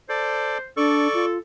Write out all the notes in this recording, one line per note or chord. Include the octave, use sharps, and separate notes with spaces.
A4 C5 D5
D4 A4 D5 C#6
F4